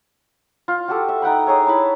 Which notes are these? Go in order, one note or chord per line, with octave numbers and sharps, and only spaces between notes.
F4
F#4 G4 A4
E5
D#4 F#5 G5 B5
D#4 G#4 C#5 E5
E4 A5 B5